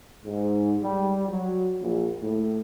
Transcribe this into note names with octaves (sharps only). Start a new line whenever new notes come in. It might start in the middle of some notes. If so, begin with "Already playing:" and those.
G#2
G3
F#3
A#1
A2